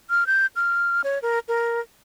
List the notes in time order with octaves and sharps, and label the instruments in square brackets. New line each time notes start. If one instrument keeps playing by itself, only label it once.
[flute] F6
G6
F6
C#5
A#4
A#4